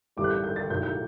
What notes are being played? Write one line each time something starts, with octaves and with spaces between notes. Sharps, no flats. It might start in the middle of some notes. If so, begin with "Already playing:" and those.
A1 A2 G3 D6
F#6
G6
G6
A6
B1 A2 F#3 G6
G6